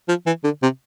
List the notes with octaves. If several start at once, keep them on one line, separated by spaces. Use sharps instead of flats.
F3
E3
D3
C3